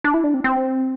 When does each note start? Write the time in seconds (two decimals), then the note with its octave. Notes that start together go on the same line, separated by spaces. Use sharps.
0.04 D4
0.14 E4
0.24 D4
0.34 C4
0.44 C4